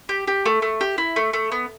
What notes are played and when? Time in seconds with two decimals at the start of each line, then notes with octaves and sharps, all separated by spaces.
0.09 G4
0.27 G4
0.46 A3
0.62 A3
0.81 G4
0.98 E4
1.16 A3
1.33 A3
1.52 B3